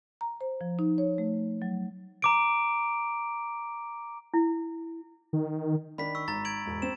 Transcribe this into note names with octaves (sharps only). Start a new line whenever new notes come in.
A#5
C5
F3
D#4
C#5
A3
F#3
A#5 D6 D7
E4
D#3
D#3 D4 B5 B6
C#6 E6
G#1 A#5 A6
G#6 D7 F#7
E1 G#2
C4 C5 E7